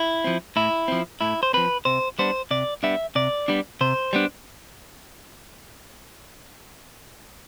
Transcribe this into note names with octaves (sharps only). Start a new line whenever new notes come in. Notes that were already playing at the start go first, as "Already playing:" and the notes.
Already playing: E4
F3 C4
A2 E4
F3 C4
A2 E4
C5
F3 C4 B4
C3 C5
G3 B3 D4 C5
C3 D5
G3 B3 D4 E5
C3 D5
G3 B3 D4
C3 C5
G3 B3 D4